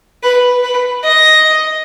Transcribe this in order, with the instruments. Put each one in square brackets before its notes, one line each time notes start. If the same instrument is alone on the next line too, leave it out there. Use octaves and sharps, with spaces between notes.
[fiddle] B4
B4
D#5